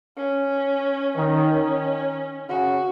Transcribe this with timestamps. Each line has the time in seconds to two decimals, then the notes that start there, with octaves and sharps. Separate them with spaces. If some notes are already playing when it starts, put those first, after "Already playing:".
0.17 C#4
1.16 D#3 C#4
2.49 C#3 F#4